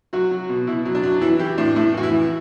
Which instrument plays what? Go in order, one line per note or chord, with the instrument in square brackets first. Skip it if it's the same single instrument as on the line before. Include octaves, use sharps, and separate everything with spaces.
[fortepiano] F#3 F#4
F#3
B2
B2 E4
F#3
D4
F#3
E3 E4
E3 G4
A2 D4
A2 E4
E3 F#4
E4
E3